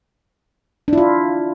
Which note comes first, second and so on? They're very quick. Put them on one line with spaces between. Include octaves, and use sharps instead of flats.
D4 E4 F4